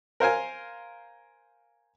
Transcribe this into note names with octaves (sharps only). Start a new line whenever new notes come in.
A#4 C5 F5 G#5